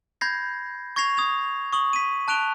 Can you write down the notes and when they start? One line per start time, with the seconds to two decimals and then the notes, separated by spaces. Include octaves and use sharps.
0.21 B5 G6 G#6 A#6 C7
0.96 C#6 G#6 A#6 C7 F7
1.17 D#6 G#6 F7
1.73 C#6 D#6 F#7
1.93 B6 D#7
2.28 A5 F#6 D7 F7 G7